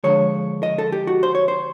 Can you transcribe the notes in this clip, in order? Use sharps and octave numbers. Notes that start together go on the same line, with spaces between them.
D3 F3 G#3 C#5
D#5
A4
G4
F#4
C5
C#5
C5